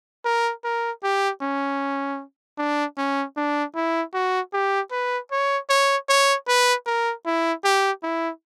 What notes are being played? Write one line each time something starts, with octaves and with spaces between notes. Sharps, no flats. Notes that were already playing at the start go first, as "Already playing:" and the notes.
A#4
A#4
G4
C#4
D4
C#4
D4
E4
F#4
G4
B4
C#5
C#5
C#5
B4
A#4
E4
G4
E4